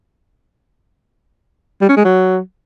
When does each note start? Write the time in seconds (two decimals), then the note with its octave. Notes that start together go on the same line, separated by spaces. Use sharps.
1.81 G3
1.89 C#4
1.97 G#3
2.04 F#3